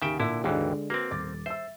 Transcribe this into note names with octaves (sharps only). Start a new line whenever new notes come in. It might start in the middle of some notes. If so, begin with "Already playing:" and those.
D#2 C#3 G4 E5 G5 D7
A#2 D3 E4 E5
G#1 D#2 D3 E3 G#3
A#3 C4 F#4 B4
D#1 D6 A6
C5 E5 E6